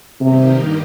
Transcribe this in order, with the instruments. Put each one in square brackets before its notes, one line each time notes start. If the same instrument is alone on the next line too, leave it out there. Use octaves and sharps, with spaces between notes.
[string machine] G2 D#3 A#3 D#4 G4 [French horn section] C3